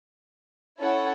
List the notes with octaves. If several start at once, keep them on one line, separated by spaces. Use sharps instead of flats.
C#4 E4 A4 C#5 F#5